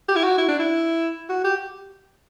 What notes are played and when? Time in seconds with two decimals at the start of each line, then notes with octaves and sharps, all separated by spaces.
0.08 G4
0.16 E4
0.23 F#4
0.38 E4
0.48 D4
0.59 E4
1.29 F#4
1.44 G4